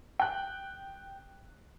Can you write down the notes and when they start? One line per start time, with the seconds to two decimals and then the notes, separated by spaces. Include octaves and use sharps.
0.19 G5 F#6